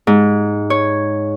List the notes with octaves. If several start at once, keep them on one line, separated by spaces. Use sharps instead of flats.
G#2
C#5